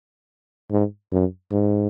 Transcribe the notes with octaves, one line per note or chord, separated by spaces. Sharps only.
G#2
F#2
G#2